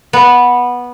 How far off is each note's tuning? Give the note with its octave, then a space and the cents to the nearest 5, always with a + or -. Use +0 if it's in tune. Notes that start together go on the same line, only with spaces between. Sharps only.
B3 -10